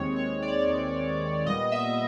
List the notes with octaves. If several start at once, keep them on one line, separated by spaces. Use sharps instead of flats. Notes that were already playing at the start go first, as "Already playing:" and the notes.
Already playing: D#2 D#3 G#3 C4 C#5
C#5
D5
D#2 D#3 G#3 C4
A#2 G3 B3 D#5
E5